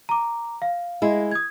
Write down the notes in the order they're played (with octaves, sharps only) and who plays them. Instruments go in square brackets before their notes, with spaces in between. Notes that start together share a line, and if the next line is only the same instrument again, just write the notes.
[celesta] A#5 D6
F5
[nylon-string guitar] G#3 E4
[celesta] D#6 G#6